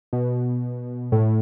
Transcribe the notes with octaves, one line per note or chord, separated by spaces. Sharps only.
B2
A2